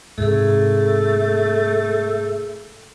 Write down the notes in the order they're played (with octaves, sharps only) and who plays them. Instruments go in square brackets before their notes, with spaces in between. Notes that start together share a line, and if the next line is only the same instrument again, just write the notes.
[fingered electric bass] G#2 C3 [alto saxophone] A3 [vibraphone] G#4 A4